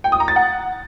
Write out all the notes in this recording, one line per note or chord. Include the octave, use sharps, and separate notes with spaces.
G5
D#6
A#5
A6
F#5